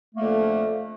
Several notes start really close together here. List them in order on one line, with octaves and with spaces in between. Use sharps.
A3 A#3 F2 D3